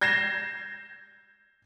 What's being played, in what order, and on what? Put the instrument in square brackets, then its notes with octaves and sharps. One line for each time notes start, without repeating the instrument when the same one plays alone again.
[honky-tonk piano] G6 G#6 A#6 C7 E7